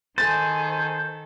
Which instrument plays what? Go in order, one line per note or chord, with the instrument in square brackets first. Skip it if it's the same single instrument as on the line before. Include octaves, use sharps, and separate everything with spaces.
[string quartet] D#3 A4 [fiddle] G#4 [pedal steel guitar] C5 [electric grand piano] A6